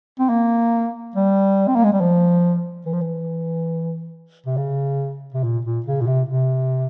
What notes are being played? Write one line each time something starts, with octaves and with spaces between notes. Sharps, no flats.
C4
A#3
G3
C4
A#3
G#3
G3
F3
E3
F3
E3
C3
C#3
C3
A#2
A#2
C#3
A#2
C3
C3